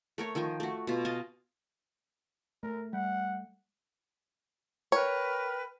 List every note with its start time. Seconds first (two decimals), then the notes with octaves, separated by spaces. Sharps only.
0.18 A3 A#4 C#5
0.35 D#3 F3 G5 G#5
0.60 A3 F#4
0.87 B2 F4
1.05 D#5 F5 G#5 A5
2.63 A3 A#4
2.93 G3 F#5
4.92 A#4 B4 C#5 G5